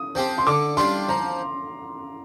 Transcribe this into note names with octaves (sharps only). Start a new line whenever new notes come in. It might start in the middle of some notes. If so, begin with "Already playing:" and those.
Already playing: D#6
F3 C4 G4
C6
D3 D6
G3 D4 F4 C6
F3 A#5